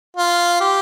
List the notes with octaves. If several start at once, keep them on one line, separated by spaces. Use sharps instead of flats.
F4
G4